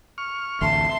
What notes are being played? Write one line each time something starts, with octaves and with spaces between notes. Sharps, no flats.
C#6 F6
A1 D2 E5 A5 C6